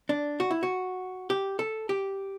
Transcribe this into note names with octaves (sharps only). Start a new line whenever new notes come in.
D4
F#4
E4
F#4
G4
A4
G4